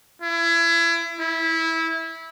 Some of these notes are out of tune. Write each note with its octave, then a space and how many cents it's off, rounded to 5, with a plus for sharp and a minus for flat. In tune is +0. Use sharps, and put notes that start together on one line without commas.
E4 +30
E4 -15